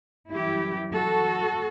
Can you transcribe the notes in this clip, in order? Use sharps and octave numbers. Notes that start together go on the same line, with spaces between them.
F#2 E3 G3 E4 G4
F#4 A4